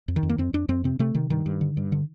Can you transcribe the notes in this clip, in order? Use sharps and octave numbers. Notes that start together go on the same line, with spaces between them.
F2
D#3
F2
A#3
F2 C4
F2 D4
F2 C4
C3 C4
C3 A3
C3 D#3
G2 D#3
G2
D3
G2
D3